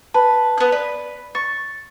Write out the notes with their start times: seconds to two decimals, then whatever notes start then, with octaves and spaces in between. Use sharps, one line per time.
0.14 B4 A5
0.58 B3 F#6
0.72 B4 D5
1.35 C#6 A6